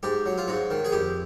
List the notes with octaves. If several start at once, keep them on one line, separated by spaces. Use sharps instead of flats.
G#2 G4
F#3
F4
G#2 F#4
D#3
G#4
F2 G4